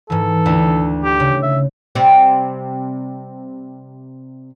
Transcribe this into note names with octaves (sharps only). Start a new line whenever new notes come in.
G#2 E3 A4
D2 E4
G4
C#3
E5
C3 G3 C4